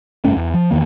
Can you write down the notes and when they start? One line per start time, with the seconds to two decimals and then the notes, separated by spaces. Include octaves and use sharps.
0.25 F1 G2 A3 C#4
0.37 E2
0.54 F3
0.71 E2 D#3 A#3